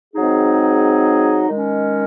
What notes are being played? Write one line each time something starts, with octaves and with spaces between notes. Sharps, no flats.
G#2 F#3 C4 D#4 G#4
D#3 G#3 C#4